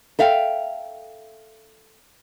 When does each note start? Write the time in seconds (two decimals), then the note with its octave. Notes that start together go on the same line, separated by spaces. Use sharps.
0.19 A4 E5 F5 G5